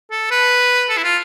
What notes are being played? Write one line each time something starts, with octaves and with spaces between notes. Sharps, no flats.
A4
B4
A4
E4
F4